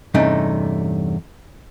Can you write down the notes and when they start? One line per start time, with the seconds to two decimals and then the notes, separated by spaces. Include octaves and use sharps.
0.14 E2 G2 C3 A3 C#4 D#4